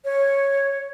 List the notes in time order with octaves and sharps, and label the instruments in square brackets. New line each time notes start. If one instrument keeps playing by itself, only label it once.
[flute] C#5